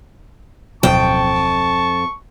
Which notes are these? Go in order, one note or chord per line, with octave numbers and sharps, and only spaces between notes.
D1 F2 B2 F#3 G5 A5 C#6